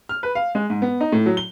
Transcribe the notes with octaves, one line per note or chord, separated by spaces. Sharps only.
F6
B4
F5
G#3
G#2
B3
D#4
A2
F#3
G7